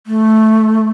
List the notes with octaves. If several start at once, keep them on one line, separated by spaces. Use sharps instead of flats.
A3